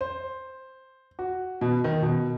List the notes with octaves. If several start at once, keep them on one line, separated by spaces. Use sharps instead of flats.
C5
F#4
B2
D#3
B2